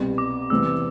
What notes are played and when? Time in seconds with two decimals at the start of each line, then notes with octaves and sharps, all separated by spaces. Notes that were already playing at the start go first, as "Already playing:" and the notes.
Already playing: C2 B2 G3
0.18 D6
0.50 E2 C3 E3 G3 B3 E6
0.67 E6